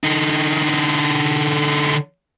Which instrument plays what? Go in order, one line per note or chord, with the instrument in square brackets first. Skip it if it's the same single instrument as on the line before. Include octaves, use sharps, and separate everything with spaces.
[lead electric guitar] D3 D#4